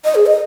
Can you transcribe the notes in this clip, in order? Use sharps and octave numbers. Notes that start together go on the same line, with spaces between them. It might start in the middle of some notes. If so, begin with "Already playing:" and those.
D#5
G#4
D#5